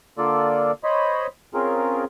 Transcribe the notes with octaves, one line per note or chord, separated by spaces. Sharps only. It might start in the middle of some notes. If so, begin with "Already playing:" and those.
D3 A#3 F4 A4 D5
C5 C#5 D#5 B5
C4 C#4 F4 G#4 A#4